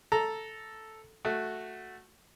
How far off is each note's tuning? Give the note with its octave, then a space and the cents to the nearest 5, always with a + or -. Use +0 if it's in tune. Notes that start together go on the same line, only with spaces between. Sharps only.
A4 +0 A#5 +0
A3 +0 F#4 +0